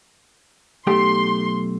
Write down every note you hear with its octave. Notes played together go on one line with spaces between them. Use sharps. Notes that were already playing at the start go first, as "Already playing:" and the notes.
B1 A3 G4 C6